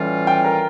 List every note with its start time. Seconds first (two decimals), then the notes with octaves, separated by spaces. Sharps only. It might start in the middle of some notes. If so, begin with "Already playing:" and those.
Already playing: A2 E3 G3 C#4 F4
0.27 G5
0.44 A#4